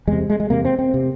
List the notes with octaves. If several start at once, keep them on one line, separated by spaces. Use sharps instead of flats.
E2 C3 G#3
G#3
G#3
E2 C3 A#3
C4
C4
C3